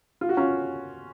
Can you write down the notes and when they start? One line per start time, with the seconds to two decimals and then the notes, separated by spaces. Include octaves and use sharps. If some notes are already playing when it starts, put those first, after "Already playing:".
0.21 F4
0.29 F#4
0.37 C#4 F4